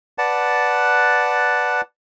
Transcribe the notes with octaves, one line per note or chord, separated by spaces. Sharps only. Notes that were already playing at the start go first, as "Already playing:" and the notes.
B4 D5 F#5 A5